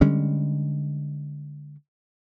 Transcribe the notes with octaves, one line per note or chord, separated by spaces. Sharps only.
D3 G3 G#3 C#4